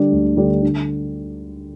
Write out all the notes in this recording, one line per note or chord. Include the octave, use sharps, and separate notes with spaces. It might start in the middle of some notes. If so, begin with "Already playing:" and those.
Already playing: D3 G3 D4
D2
D3 G3 D4
D3